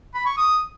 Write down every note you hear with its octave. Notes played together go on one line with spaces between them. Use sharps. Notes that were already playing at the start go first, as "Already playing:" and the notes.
B5
C#6
D#6